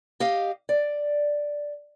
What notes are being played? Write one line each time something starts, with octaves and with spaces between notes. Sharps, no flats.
G4 D#5 F5
D5